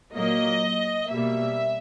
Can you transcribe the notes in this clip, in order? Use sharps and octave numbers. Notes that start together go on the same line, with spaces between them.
A#2 F#3 A#3 D#5
B2 G3 A#3 E5